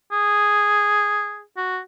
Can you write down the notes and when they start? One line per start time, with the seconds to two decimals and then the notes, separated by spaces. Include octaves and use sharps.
0.12 G#4
1.57 F#4